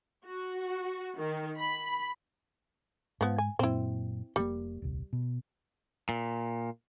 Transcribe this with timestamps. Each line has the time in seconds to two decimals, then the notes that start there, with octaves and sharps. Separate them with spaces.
0.25 F#4
1.19 D#3
1.57 B5
3.21 G#2 F3 B3
3.38 G#5
3.59 F#2 A#2 C4 E4
4.36 F1 A#2 G3 A#3
4.82 D#1 C2
5.13 B2
6.09 A#2